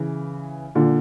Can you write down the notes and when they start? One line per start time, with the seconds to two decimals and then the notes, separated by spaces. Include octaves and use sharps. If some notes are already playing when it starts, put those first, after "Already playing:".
Already playing: C#3 E3
0.75 A#2 D3